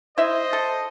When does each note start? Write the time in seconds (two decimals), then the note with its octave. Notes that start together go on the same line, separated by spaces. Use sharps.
0.18 E4 C5 D#5 E5
0.53 A4